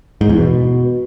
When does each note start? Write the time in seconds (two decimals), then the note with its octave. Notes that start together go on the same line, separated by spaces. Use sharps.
0.21 G#2
0.29 E2
0.38 B2